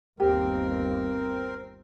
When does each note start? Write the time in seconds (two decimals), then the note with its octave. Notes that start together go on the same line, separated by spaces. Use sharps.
0.20 G1 D#2 C4 G4 A#4